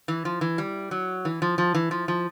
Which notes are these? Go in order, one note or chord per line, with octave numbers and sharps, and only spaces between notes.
E3
F3
E3
G3
F#3
E3
F3
F3
E3
F3
F3